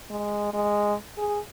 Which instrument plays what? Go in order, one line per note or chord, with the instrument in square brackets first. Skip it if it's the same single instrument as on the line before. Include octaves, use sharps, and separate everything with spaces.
[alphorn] G#3
G#3
G#4